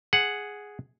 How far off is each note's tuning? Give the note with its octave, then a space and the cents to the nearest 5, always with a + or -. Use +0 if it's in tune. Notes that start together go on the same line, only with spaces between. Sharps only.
G#4 +0 F#5 +0